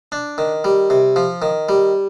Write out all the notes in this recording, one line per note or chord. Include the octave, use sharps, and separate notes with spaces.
D4
D#3
G3
C3
F3
D#3
G3